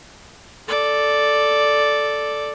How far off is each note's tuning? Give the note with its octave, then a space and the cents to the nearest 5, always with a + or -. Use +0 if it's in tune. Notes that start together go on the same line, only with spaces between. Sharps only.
A4 +0 D5 +0